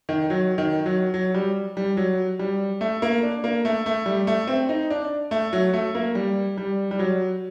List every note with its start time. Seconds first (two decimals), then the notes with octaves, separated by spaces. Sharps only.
0.09 D#3
0.30 F#3
0.58 D#3
0.86 F#3
1.14 F#3
1.34 G3
1.77 G3
1.97 F#3
2.39 G3
2.81 A3
3.02 A#3
3.23 D4
3.44 A#3
3.65 A3
3.86 A3
4.06 G3
4.27 A3
4.48 C4
4.69 D#4
4.90 D4
5.31 A3
5.53 F#3
5.73 A3
5.95 A#3
6.15 G3
6.57 G3
6.91 G3
6.99 F#3